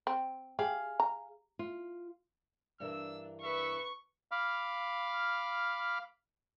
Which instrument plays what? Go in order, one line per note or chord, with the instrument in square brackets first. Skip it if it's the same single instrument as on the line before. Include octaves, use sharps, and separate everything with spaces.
[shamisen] C4
[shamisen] G4 [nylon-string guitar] G#4 F5
[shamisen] A#5
[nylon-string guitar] F4
[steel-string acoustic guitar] G2 E3 A#4 [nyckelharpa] D4 [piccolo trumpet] E6
[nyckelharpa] B4 [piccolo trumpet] E5 [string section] C#6
[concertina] F5 B5 D6 F6